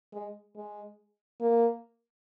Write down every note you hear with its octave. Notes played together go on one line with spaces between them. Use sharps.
G#3
G#3
A#3